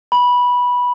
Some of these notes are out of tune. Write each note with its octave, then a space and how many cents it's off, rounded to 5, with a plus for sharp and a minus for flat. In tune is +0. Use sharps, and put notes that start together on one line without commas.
B5 -15